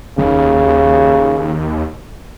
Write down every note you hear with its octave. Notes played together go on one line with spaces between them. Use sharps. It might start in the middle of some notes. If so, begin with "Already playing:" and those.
F1 D#2 C#3